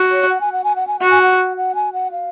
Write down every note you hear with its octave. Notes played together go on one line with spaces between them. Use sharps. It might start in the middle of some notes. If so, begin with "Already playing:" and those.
Already playing: F#4
C#5
F#5
G#5
F#5
G#5
F#5
G#5
F#4 F#5
G#5
F#5
F#5
G#5
F#5
F5